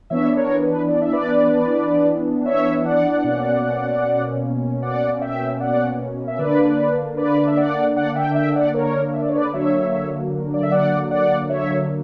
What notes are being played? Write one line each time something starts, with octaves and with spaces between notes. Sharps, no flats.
E3 B3 D4 C#5 E5
A#4 C#5
B4
D5
E5
B4 D5
C#5 E5
D5 F#5
B2 A#3 C#4
D5 F#5
E5 G5
D5 F#5
E5
D3 A#3 D4 B4 D5
B4 D5
E5
D5 F#5
D5 F#5
E5 G5
E5 G5
D5 F#5
A#4 C#5
E5
D5
C#5
B4 D5
D3 F#3 A#3 C#5 E5
D5
E5
D5 F#5
D5 F#5
C#5 E5